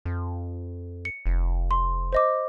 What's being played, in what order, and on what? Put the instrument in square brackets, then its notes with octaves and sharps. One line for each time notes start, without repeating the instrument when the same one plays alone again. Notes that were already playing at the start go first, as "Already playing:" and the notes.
[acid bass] F2
[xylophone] C#7
[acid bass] F1
[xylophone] C6
C5 D#5 D6